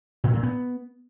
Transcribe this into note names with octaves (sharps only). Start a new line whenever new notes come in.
A2
A#2
B3